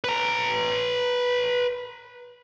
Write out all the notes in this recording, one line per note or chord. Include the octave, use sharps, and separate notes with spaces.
B4 A#5